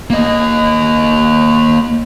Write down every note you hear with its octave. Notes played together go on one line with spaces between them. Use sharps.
A#3 D#5